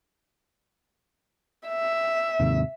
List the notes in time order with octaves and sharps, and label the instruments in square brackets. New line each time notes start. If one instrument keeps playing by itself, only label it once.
[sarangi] E5
[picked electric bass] D#2 G#2 C3